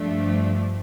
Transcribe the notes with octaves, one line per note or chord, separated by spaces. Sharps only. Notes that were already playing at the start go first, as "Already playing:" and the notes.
Already playing: G2 F3 A3 D4